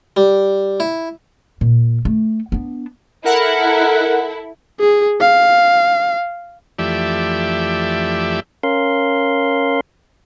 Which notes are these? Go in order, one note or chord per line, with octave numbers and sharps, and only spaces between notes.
G3
E4
A#2
A3
B3 D4
E4 A4 A#4 F#5
G#4
F5
F2 E3 A3 G4 D5 E5
C#4 A#4 F5 C6